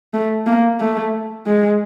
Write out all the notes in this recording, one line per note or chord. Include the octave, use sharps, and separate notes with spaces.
A3
A#3
A3
G#3